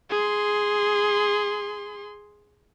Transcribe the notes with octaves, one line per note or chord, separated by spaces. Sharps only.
G#4 C6